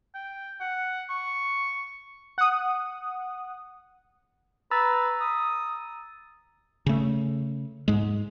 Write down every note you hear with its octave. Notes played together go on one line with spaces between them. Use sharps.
G5
F#5
C#6
F#5 D#6
B4 A#5 E6 A6
D#6
C#3 A3
G#2 G#3